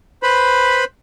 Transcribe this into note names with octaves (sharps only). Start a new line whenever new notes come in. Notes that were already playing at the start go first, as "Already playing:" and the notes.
B4 C5 B5